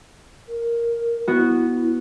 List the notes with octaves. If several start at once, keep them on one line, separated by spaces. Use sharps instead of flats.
A#4
B3 E4 F#4
E4